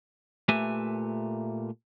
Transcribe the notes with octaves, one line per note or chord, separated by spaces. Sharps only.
A#2 A3 G4 B4 E5 G#5